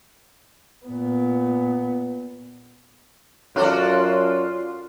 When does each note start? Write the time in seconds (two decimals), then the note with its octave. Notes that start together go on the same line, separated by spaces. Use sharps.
0.86 A#2 B3
3.56 F#2 C#4 F4 F#4 A4 D5 F6 F#6